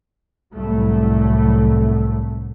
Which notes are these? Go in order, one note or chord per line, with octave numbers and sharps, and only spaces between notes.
C2 A2 F#3 A3